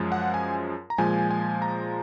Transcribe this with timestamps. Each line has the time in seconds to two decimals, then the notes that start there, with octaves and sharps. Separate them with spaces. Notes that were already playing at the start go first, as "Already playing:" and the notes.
Already playing: F#2 F3 G#3
0.12 F#5
0.34 G#5
0.90 A#5
0.98 A#2 F3 G#3 G#5
1.31 G#5
1.62 A#5